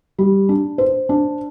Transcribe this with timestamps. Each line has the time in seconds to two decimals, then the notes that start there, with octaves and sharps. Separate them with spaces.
0.18 G3
0.49 D4
0.78 C5
1.09 D4